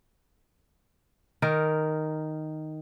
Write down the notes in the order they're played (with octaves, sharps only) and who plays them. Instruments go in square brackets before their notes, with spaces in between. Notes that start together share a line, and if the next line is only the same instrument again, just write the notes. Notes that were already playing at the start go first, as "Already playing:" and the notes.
[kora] D#3 A#4